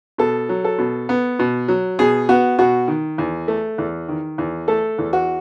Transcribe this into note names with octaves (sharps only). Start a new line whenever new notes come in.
B2 A4
F#3
A4
B2
B3
B2
F#3
B2 G#4
B3 F#4
B2 F#4
D#3
E2
A3
E2
D#3
E2
A3 A4
E2
F#4